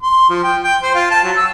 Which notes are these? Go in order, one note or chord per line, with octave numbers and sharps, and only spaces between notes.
C6
F3
G5
G5
C5
F4
A5
F#3
E6